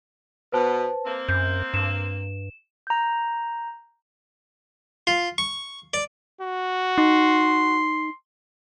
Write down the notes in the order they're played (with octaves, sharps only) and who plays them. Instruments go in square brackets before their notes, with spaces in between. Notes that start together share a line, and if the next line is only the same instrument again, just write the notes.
[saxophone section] B2 B3 [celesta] B4 C5 A5
[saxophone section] A#3 C4
[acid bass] F#2 [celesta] G6
[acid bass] G2 [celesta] E7
[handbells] A#5 G6
[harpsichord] F4
C#6
D5
[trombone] F#4
[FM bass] D#4 [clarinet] C6